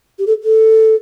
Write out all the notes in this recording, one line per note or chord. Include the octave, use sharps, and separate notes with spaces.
G4
A4
A4